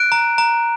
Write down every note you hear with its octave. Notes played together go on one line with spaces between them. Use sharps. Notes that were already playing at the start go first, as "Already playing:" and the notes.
Already playing: F#6 D7
A#5
A#5